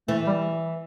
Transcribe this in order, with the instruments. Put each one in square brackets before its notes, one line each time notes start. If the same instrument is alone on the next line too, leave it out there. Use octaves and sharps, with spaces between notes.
[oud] E3 [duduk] A3
[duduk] G3